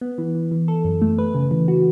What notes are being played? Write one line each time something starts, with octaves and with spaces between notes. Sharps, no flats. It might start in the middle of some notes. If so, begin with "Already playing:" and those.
B3
E3
E3
E3
A4
F#2
A3
B4
C#3
E3
F#4